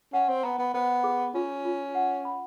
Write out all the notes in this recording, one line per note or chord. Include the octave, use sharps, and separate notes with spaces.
C#4 F#5
C4
B3 A#5
B3
B3 C5
G#4
C#4 F4
F4
F#5
B5